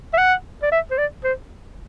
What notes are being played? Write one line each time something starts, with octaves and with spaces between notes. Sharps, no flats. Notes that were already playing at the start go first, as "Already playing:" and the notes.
E5
F#5
D5
E5
C5
D5
C5